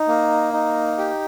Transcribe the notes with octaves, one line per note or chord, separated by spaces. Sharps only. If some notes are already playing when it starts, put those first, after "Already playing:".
Already playing: D#4
A#3
D#4
G4